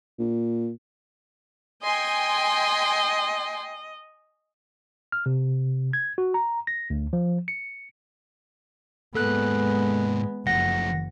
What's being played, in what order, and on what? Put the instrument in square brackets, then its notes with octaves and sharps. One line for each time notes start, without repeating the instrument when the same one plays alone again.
[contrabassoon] A#2
[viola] D#5 [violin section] G5 G#5 C6
[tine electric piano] F6
C3
G#6
F#4
A#5
A#6
D2
F3
C#7
[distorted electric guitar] G#2 A#3 [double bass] G#3 B3 [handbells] A4 F#6
[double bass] F#1 [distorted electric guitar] F3 A3 [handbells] F#5 A#6